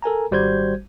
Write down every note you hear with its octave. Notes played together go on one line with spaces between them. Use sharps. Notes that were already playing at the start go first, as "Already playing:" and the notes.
A4 A#4 G#5 A#5
G#1 G3 F#4 C5 G6 G#6